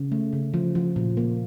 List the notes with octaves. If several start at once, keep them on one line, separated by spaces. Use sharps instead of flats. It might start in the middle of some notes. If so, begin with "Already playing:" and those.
Already playing: C#3
A3
C#3
F3
F3
A#2
A#3